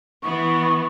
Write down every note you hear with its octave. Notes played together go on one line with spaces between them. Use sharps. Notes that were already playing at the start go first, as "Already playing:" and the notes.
E3 B3 C#6